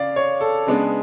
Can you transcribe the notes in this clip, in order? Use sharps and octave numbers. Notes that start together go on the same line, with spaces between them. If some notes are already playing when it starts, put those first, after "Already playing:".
Already playing: C#3 D5 F5
C#5
A4
C#3 G#3 B3 D4